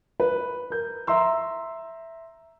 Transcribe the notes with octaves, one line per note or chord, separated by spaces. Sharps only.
B4
A#4 G6
E5 A#5 C6 E6